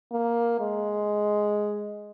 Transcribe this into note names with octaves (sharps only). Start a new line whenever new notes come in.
A#3
G#3